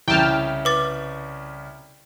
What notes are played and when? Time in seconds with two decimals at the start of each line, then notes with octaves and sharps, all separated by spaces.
0.08 C2 C#3 E4 G5 A5 F6
0.65 B4 D6 A6